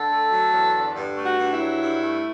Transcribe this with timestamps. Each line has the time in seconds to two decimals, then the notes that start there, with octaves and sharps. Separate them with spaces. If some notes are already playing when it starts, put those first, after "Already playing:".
Already playing: D3 A4
0.11 A3
0.31 F#3
0.53 E2
0.75 D3
0.95 G2
1.17 A3
1.23 F#4
1.38 G2
1.53 E4
1.60 F#3
1.81 G2
2.02 A3